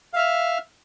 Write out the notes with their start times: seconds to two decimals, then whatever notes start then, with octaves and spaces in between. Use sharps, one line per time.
0.13 F5
0.16 E5
0.19 F6